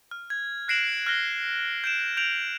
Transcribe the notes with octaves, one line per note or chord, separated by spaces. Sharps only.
F6
G#6
F#6 A#6 C7 D7 E7 F#7
F6 F#6 A#6 G7
G6 D7 E7
G6 D7 F7 F#7